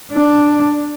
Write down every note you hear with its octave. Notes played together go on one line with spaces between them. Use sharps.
D4